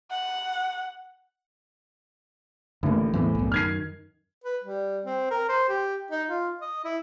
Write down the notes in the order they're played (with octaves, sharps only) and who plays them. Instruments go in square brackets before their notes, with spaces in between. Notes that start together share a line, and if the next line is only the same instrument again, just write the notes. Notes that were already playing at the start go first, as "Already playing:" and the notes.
[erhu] F#5
[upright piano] A1 A2 [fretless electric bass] D3 A#3
[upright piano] E2 A2 [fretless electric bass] E3 B3 C4
[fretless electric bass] C2 F#2
[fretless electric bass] F#2 D#3 [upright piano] F6 G#6 C7
[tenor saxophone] B4
G3
C4
A#4
C5
G4
D#4
F4
D#5
E4